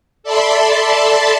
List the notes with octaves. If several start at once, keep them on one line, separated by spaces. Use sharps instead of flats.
A4 D5 E5 A5 B5 C6